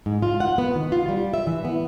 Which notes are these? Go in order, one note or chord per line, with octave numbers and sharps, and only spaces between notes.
G#2
F4
F#5
B3
D#3
F4
G3
E5
E3
B3